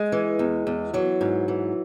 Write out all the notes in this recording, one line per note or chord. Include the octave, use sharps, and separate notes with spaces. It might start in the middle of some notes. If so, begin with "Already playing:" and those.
Already playing: G#3
E3
E2
E2
E3 F#3
G#2
E3